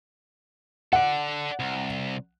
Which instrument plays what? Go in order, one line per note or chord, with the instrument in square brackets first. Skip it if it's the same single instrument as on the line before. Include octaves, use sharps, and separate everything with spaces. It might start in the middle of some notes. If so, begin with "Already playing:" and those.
[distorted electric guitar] A4 D5 [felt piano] F#5
[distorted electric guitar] C2